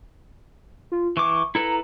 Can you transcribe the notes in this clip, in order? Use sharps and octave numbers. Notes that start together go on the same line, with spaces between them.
F4
E3 C#6 D6
E4 A4 B4 A#5